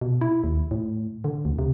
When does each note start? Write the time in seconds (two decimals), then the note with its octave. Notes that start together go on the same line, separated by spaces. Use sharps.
0.01 B2
0.21 E4
0.44 D#2
0.71 A2
1.24 D3
1.45 D2
1.59 C3